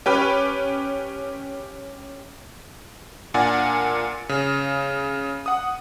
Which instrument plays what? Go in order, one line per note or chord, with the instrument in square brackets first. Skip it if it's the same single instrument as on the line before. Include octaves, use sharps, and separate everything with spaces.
[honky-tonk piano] C#4 G4 B4
[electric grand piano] A#2 D4 A#4 F#5 G#5 A6
C#3
F#5 D#6